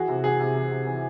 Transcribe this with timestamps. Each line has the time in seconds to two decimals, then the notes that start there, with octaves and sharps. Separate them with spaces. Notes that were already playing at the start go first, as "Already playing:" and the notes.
Already playing: E3 F#4 G#4
0.08 C3
0.24 E3 F#4 G#4
0.40 C3
0.56 E3
0.71 C3
0.87 E3